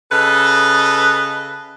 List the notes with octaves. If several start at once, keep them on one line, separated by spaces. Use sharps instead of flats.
C#3 A4 B4 D#5